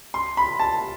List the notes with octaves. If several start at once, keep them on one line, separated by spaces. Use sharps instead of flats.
C6
B5
A5